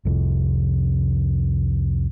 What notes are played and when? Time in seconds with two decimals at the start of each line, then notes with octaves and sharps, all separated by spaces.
0.05 C2 F2 C3